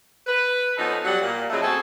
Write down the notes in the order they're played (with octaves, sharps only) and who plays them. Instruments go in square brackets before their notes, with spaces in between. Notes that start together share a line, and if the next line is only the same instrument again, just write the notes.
[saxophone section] B4
F3 B3 C#4 D#4 A4
F#3 G3 G4 F#5
A#2
A#2 C#3 F3 F#3 G#3 A3
A3 C4 F#4 G#4 A4